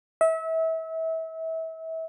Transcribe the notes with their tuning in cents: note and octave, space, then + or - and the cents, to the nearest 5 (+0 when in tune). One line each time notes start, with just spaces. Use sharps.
E5 -30